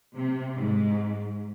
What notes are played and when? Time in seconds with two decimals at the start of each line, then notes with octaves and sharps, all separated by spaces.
0.16 C3
0.55 G#2